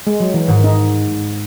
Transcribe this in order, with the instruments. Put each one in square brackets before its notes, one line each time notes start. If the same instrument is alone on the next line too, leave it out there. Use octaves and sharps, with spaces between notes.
[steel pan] G#3
F#3
E3
[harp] G#2 [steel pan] D#3
[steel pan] D#4